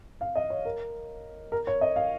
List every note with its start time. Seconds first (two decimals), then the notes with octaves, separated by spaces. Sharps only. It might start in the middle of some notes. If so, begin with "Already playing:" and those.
0.21 F5
0.36 D#5
0.50 C#5
0.65 A#4
1.52 A#4
1.67 C#5
1.81 D#5
1.96 F5